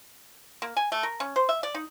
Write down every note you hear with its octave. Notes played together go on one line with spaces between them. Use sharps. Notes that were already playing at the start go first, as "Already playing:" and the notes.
A#3
G#5
A3
A#4
C#4
C5
E5
D5
D#4